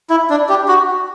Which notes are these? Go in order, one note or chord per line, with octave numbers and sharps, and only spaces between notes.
E4
D4
G4
F#4